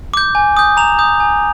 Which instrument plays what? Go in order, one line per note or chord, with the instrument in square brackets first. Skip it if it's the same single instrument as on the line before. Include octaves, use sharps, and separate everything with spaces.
[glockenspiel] D6 G6
G#5
D#6 G6
A#5 F7
D#6 G6
G#5